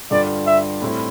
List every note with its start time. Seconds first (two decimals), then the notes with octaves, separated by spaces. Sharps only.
0.11 G2 D3 G3 D4 F4 D5
0.46 E5
0.82 A2 G3 C4 E4